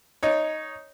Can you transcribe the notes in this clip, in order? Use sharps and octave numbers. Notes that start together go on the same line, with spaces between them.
D#4 C#5